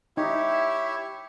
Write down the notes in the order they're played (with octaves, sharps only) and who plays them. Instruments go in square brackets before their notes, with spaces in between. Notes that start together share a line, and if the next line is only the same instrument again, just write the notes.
[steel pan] D#4 [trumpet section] E4 E5 [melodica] G4 C#5